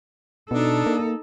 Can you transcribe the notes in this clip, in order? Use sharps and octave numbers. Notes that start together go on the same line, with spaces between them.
B2 D4 D#4 A4
A#3